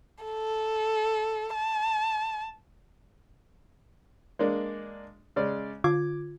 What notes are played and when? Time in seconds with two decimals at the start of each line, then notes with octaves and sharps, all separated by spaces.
0.24 A4
1.56 A5
4.39 G#3 A#3 D4
5.36 C#3 G#3 D5
5.84 D3 F4 D6 G#6